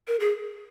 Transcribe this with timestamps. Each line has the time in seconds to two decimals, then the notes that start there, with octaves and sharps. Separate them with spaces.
0.08 A#4
0.20 G#4